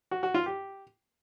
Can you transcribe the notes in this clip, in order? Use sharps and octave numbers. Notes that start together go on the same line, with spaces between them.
F#4
F#4
F4
G4